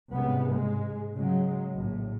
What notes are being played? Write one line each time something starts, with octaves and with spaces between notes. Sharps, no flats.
C2 G#2 C#3 B3
G#2 G#3
C#3 F#3 G#3
A#1 A2